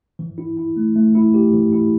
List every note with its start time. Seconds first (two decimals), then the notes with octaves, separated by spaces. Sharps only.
0.19 E3
0.38 E4
0.57 E4
0.77 A3
0.96 A3
1.15 E4
1.34 G4
1.53 E3
1.73 E4